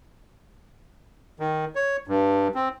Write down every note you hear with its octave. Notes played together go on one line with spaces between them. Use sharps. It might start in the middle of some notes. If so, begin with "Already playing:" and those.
D#3
C#5
G2
C4